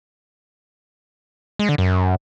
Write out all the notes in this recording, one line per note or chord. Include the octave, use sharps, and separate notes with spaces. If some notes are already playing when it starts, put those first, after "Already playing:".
G#3
D3
F#2